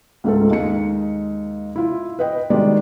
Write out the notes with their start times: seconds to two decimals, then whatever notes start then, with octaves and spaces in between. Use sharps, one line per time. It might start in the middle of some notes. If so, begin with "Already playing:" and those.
0.24 C#2 G#2 A3 F4 A4
0.50 D#2 G#3 D#4 C#7
1.76 E4 F4
2.19 B4 D#5 G5
2.50 D#3 G3 G#3 F#4 D5